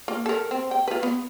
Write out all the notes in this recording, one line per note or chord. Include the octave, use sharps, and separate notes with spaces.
A#3 F4
A4 A#4
C4
G5
F4 B4
B3